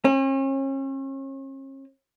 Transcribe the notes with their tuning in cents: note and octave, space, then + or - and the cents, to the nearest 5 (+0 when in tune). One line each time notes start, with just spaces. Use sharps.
C#4 -40